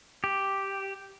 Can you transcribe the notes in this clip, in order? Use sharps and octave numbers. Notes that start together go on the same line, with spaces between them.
G4